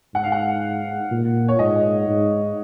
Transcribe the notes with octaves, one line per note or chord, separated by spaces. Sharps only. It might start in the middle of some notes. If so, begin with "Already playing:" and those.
G#2 F#5
F5
F#5
A#2
C#5
G#2 D#5
G#2